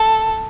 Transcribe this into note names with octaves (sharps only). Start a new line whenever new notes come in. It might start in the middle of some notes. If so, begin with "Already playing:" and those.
Already playing: A4